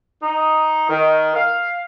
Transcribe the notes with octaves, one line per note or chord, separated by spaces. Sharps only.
D#4
D#3
F5